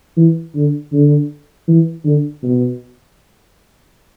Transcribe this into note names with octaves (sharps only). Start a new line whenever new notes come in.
E3
D3
D3
E3
D3
B2